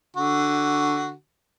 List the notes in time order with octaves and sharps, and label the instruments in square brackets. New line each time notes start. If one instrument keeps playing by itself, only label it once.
[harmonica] D3 F#4